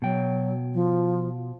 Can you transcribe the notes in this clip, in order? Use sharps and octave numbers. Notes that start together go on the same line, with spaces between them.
B2 F#3 G5
F3